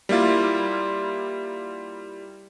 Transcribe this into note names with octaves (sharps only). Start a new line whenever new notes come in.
G3 A#3 E4 F4